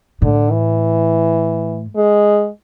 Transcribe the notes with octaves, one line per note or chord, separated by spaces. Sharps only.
A2 D3
E3
G#3